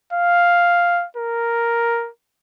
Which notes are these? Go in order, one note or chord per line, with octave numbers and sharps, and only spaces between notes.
F5
A#4